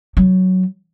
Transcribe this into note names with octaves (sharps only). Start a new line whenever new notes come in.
F#3